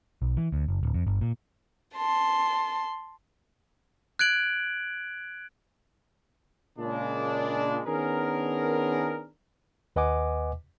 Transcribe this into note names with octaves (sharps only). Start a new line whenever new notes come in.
B1
E3
D2
F#1
D1
F2
G1
A#2
A5 C6
F#6 G#6 D7 F#7
A#2 C#3 G#3 D4
D#3 B3 C#4 D4 G#4 A#4
D#2 B4 D#5 F#5 G#5 D6